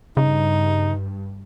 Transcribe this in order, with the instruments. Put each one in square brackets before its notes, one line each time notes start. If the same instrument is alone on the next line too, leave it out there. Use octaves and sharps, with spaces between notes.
[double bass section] G2 [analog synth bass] C#3 [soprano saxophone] D#4